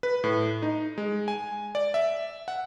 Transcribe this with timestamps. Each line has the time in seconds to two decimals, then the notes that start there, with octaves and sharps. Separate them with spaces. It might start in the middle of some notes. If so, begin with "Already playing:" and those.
0.03 B4
0.24 A2
0.62 D#4
0.98 G#3
1.28 G#5
1.75 D5
1.94 E5
2.48 F#5